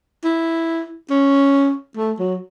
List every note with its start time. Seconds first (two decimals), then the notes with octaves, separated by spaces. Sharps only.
0.24 E4
1.10 C#4
1.97 A3
2.19 F#3